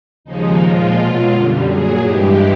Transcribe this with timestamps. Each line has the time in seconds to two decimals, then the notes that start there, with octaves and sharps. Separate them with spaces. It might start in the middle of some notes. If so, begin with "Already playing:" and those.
0.24 D#2 C#3 F3 G#3 D#4
0.60 A#2 F3 G#3 F4
0.95 B2 F#3
1.30 F#2 D3 G3
1.65 A#2 F#3 G#4
2.00 G2 E3 G#3 G4